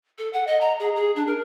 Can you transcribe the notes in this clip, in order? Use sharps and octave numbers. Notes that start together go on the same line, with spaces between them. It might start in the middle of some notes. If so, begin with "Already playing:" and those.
A4
F#5
D#5
A#5
G#4
G#4
D4
A#4